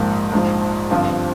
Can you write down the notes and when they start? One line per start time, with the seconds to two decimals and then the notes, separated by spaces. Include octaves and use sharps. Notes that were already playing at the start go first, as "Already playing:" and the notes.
Already playing: A#1 G#2 F3 A#3
0.33 A#1 G#2 F3
0.90 G1 G2 F3 C4 F4